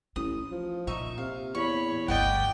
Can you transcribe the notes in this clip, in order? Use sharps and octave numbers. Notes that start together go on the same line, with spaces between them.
A1 C#4 D#6
F3
A#2 D#4 E5 C#6
C3 F5
E2 C#5 B5 C#6
G1 D2 D5 D#5 F#5 G5